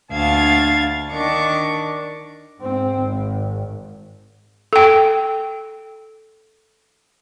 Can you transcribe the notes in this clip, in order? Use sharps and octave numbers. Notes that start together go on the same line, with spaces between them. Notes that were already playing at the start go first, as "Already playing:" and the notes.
D2 F5 A5 G#6 A6
D#3 D4 C#6 D6
G#2 C4
G#1
A4 G5